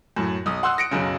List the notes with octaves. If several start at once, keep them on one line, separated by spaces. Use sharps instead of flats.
F#2 A2
B1 D#6
F#5 C6 E6 F#6
A#6 C#7 D7
B1 F#2 C#3